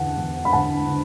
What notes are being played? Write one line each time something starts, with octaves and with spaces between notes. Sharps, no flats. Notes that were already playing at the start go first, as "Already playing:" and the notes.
Already playing: E2 D3 F#5 A5
E2
B5
D3 F#5 A5
D3